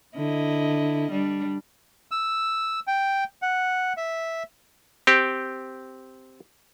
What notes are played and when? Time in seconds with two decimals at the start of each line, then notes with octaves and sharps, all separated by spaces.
0.17 D3 E4 D#5
1.11 G3 D4
2.11 E6
2.87 G5
3.42 F#5
3.97 E5
5.07 C4 G4